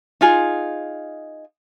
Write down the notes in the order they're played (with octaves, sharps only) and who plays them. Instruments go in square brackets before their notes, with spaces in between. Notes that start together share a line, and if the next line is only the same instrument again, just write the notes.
[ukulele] D#4 F4 G#4